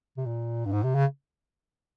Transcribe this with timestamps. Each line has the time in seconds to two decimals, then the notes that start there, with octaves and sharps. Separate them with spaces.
0.17 C3
0.26 A#2
0.65 G2
0.72 G#2
0.83 C3
0.95 C#3